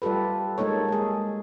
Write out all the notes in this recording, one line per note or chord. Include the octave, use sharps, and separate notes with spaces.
G3 F4 G4 A4 B4
G#3 A#3 D#4 A4 C#5
G#3 G#4